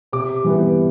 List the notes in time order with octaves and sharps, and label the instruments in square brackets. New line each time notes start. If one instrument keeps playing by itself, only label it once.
[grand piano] C3 D6
E3 G3 B3